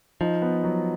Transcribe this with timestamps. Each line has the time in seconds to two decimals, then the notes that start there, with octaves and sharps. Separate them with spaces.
0.21 F3 D#4
0.42 B3
0.64 F#3